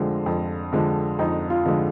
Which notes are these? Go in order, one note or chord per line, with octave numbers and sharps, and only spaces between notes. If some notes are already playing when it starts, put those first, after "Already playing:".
Already playing: F2 D3 F3 G#3
F2
D3 F3 G#3
F2 D#4
F4
D3 F3 G#3